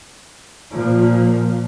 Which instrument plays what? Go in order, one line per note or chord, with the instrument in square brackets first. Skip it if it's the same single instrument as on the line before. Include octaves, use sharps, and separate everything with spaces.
[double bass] A#2 F3